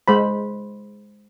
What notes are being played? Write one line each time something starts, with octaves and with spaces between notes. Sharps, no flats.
G#3 C5 B5